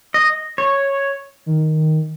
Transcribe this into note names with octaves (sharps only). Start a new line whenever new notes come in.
D#5
C#5
D#3